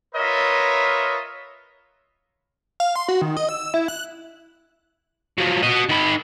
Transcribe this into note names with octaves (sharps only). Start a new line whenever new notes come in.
F4 A#4 B4 C#5 D#5 E5
F5
C6
F#4
D#3
D#5
E6
E4
F#6
F3 F#3
F#4 D#5
D#3 B5